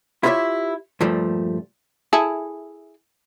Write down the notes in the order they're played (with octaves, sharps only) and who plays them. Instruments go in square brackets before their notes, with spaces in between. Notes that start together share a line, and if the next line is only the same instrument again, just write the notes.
[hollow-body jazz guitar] E4 F4 G4 B4 C#5 E5
G2 A#2 F3 G3 A3
[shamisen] E4 G#4 A4